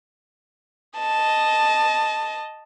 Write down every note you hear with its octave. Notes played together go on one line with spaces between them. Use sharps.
D#5 A5